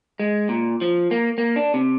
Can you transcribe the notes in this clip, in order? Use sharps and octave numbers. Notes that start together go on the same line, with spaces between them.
G#3
A#2
F3
A#3
A#3
D4
C3